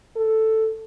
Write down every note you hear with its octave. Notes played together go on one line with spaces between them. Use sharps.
A4